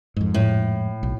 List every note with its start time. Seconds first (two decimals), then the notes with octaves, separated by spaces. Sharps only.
0.16 F2 G#2
0.34 A2
1.03 B1